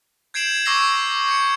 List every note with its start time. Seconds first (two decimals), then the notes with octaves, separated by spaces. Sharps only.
0.34 G6 G#6 C7 D7 E7 F#7
0.65 C#6 D6 E6 A#6 C7
1.28 G6 C#7